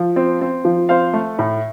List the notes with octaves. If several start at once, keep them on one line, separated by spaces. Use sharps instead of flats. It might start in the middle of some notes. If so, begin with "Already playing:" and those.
Already playing: F3
C4
C4
F3
C4 C5 F5
A3
A2